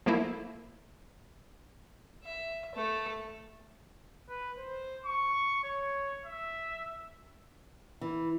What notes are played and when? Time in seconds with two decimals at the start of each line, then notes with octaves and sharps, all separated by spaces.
0.06 F3 A3 A#3 E4
2.24 E5
2.75 A3 A4
4.29 B4
4.58 C5
5.06 C#6
5.64 C#5
6.26 E5
8.01 E3